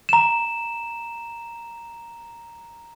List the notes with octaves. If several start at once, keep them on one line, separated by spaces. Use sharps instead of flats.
A#5 E7